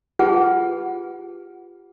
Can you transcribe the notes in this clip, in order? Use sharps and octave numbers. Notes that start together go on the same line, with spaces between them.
F4 G4 G#4 B4 F#5 A5